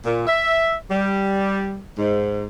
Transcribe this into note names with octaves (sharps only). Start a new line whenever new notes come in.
A#2
E5
G3
G#2